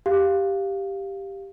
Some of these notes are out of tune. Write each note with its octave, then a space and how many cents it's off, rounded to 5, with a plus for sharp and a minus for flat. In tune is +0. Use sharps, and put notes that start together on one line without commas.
G4 +0 F5 +0